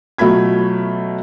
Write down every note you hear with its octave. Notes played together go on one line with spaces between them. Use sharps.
B2 F#3 A3 F4 B5 G#6